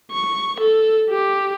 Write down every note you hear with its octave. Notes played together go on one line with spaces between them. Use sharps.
C#6
A4
G4